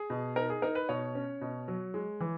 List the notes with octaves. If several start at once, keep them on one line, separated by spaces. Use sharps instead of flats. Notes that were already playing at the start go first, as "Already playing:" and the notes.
Already playing: G#4
B2
D#4 A#4
G#4
D#4 A#4
B4
B2 C#5
C#4
B2
F#3
G#3
E3